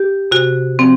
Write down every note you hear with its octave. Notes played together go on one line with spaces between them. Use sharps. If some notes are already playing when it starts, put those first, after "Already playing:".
Already playing: G4
C3 F#4
F3 C4